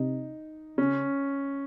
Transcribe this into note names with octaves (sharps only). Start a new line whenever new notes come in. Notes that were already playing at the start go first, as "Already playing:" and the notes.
Already playing: C3 D#4
C#3 C#4